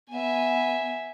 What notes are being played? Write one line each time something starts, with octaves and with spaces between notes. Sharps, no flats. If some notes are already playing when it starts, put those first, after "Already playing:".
B3 E5 G#5